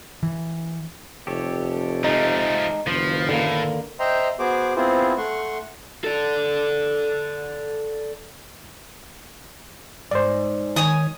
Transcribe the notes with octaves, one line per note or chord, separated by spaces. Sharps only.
E3
F1 G4 A4 C#5
F3 G#3 A3 D#4
F#1 D#3 F3 B4 C6
A2 D3 A#3
C5 D#5 E5 G5 A#5 C6
B3 F#4 G#4 C5 D6
B3 C4 E4 F4 G#4 C5
A3 F#5 C6 C#6
A4 D5
G#2 C5 D5
D#3 C#5 G#5 D#6